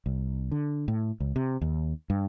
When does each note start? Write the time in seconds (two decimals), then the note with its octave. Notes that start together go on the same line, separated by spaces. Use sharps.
0.06 C2
0.51 D3
0.88 A2
1.20 C#2
1.36 C3
1.61 D#2
2.10 G2